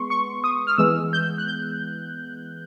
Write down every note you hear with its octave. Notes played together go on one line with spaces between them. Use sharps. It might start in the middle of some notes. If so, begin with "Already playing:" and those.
Already playing: G#3 B3 C6 C#6
C#6
D#6
F6
E3 G#3 B3 E6
G6
F#6
G6